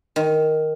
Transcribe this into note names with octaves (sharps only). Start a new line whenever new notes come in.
D#3